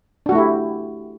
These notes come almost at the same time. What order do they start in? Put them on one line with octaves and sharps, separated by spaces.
D4 F#4 A3 E4 G4